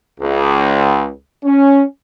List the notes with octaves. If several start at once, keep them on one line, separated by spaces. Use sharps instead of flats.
C#2
C#4